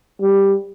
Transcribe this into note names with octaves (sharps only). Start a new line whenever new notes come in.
G3